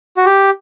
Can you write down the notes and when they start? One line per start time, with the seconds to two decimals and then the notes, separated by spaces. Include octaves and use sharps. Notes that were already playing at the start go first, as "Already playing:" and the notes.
0.17 F#4
0.25 G4